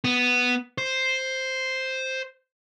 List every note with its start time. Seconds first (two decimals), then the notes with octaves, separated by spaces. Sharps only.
0.04 B3
0.78 C5